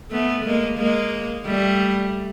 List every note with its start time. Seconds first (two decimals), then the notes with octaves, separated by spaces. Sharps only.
0.11 A3 B3
0.44 G#3 A#3
0.78 G#3 A#3
1.45 G3 A3